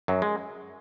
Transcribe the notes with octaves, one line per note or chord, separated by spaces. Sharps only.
F#2 F#3
G#3